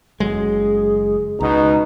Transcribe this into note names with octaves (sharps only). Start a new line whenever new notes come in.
F#1 F#3 G#3 G#4
C#2 B2 D#4 A#5